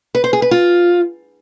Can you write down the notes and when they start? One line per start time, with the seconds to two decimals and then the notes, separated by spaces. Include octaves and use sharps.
0.15 B4
0.24 C5
0.33 G#4
0.42 B4
0.51 F4